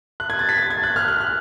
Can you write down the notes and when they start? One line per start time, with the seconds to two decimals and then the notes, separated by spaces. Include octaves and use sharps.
0.20 F#6
0.30 G#6
0.39 A6
0.49 B6
0.58 A6
0.70 G#6
0.83 F#6
0.96 F6
1.08 F#6
1.20 F6